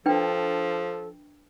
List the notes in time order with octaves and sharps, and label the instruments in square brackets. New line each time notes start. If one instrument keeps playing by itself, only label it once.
[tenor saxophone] F3 [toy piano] D4 B4 G5 [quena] A4